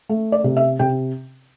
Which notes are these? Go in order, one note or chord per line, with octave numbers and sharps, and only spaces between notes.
A3
D5
C3
E5
C3 G5